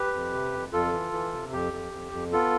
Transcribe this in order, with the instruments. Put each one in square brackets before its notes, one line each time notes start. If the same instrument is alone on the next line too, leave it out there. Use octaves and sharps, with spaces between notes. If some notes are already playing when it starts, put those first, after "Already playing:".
Already playing: [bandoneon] G4 B4
F2
C3
F2
F2 F4 A4
E3
E3
C3
F2 G4
F2
F2
F2
B3 F4 A4